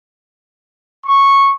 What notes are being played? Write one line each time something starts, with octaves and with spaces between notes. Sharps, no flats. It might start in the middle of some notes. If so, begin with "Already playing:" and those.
C#6